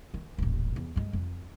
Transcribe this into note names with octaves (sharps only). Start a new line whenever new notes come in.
D#3
D#1 A1
E2
G2 G#3
F2